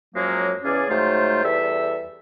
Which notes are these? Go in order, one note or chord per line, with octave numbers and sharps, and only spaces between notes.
F#2 F3 F#3 G#3 A#3
E2 C#3 C#4 G#4 D5
G#2 F#3 A3 F4 C5 G5
E2 G3 A4 E5